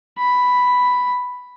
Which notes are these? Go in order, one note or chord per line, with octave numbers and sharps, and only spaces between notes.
B5